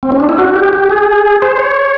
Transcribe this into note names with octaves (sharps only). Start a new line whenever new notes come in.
C4
C#4
D4
E4
F#4
G4
G4
G#4
C5
C#5